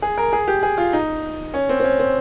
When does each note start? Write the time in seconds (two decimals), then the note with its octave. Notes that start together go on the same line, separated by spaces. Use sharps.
0.02 G#4
0.17 A#4
0.33 G#4
0.48 G4
0.63 G#4
0.78 F4
0.93 D#4
1.54 C#4
1.69 C4
1.80 C4
1.84 C#4
1.99 C4